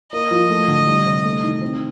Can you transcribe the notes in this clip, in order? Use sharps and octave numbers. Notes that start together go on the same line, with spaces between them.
A#3 D#5
F3
A3
D3
G3
C3
A3
D#3
C4